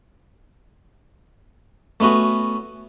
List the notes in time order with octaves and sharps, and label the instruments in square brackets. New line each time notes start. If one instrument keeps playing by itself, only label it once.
[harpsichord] A3 B3 C#4 F#4